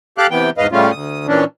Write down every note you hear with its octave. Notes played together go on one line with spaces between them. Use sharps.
G4 A4 F5 D6 F#6
C3 E3 B3 G5
E2 G#2 B4 D#5 F5
A2 C#3 G3 A3 C#4 F4
D2 D#6
A#2 E3 C#4 D4